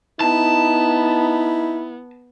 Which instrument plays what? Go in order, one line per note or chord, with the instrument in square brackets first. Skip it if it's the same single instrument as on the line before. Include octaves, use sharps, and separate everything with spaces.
[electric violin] B3 [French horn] D#4 [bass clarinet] E4 [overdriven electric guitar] A5